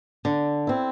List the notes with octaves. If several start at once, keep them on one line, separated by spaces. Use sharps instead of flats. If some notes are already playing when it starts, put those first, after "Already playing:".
D3
C4 E4